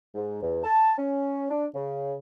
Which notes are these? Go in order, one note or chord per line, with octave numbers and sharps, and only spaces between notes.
G#2
E2
A5
C#4
D4
C#3